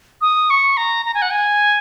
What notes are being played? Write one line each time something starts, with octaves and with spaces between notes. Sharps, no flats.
D#6
C#6
A#5
A#5
G#5
F#5
G#5